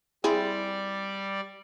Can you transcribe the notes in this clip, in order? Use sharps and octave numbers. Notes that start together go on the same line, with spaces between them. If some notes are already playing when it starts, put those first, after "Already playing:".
G3 C4 E4 G#4 D5